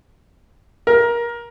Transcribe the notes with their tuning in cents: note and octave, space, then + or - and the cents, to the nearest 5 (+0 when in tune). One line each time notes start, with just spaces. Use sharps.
A#4 +20